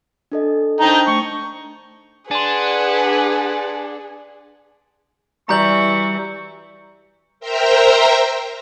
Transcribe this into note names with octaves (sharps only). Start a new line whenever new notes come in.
D4 A4 D#5
D4 D#4 C5 G5 A5 A#5
A3 C#6
D4 G#4 B4 F#5 G#5 C6
E3 G3 F#4 D5 A#5 C#6 G6 F#7
A#4 C5 E5 G5 A#5